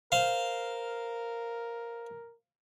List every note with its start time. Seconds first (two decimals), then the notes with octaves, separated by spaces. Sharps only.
0.12 A#4 C5 F5